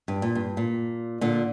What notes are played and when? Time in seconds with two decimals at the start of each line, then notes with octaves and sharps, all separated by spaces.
0.08 G2
0.22 A#2
0.35 G2
0.57 A#2
1.21 A#2 D3